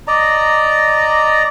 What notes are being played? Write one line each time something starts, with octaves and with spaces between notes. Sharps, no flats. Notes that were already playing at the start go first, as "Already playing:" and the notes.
D5 D#5 A#5